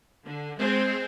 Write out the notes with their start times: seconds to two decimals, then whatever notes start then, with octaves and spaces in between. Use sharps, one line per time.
0.24 D3
0.58 G#3 C4